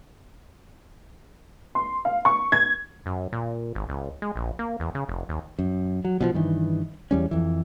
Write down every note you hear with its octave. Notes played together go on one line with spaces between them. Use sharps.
C6
F5
C#6
G#6
F#2
A#2
G#1
C#2
G#3
A#1
A#3
E2
C#3
F1
D#2
F#2
F#3
B2 E3 F3
G2 D#3 E3
E2 G3 C#4
F2 E3